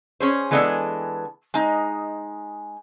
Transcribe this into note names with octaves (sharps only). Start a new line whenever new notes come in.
C#4 G#4 C5
E3 G#3 B3 D4 A4 G#5
G#3 D#4